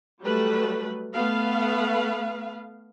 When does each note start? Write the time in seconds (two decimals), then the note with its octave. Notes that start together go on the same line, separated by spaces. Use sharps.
0.22 F#3 G3 A3 B4
1.14 A3 B3 B4 F5